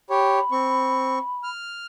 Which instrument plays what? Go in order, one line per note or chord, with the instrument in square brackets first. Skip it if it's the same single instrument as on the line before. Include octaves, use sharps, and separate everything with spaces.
[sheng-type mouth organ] G4 C#5 [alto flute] B5
[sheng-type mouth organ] C4 C#6
F6